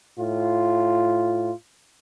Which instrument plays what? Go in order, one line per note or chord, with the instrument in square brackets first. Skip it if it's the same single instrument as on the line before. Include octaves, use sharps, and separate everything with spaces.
[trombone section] A2 F4